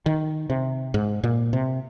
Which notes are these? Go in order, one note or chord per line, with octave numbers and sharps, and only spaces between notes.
D#3
C3
G#2
A#2
C3